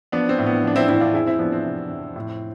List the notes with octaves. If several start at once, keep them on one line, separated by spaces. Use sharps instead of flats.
F3 B3 D4
C4
A2
B3
F3 D4
C4 E4
A2 C4 E4
D4 F4
F2 E4 G#4
C4 E4
F3 B3 D4
C4
C3
F2
A2